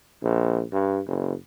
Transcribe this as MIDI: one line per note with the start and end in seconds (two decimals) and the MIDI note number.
0.23 0.63 34
0.73 1.00 43
1.07 1.33 30